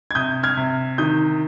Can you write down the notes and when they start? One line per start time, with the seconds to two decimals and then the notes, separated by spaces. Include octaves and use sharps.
0.11 G#6
0.15 C3 D#6 G6
0.43 F6 G#6
0.57 C3
0.98 D#3 D#6 G6